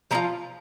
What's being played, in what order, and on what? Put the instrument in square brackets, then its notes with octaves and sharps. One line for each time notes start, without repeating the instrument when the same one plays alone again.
[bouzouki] F3 C4 F4 A#5